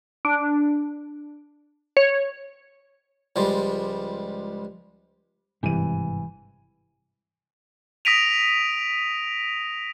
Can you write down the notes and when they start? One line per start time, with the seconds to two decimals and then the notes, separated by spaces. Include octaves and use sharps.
0.25 D4
1.97 C#5
3.36 C#2 F3 G3 G#3
5.63 G#1 G2 C3 E3 D#7
8.05 D#6 A#6 B6 D7 D#7 F7